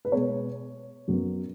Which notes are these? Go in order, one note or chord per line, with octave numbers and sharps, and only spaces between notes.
B4
B2 G#3 B3 C#5
F#2 F#3 B3